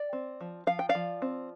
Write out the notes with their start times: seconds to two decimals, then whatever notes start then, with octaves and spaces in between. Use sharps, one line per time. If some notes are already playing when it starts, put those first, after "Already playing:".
Already playing: D5
0.13 C4
0.41 F3
0.67 F3 F5
0.79 G5
0.89 D5 F5
0.95 F3
1.22 C4